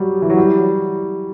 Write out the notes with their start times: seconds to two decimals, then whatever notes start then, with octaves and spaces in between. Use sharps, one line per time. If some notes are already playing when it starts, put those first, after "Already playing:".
Already playing: F#3 G3
0.22 E3
0.30 F#3
0.37 G3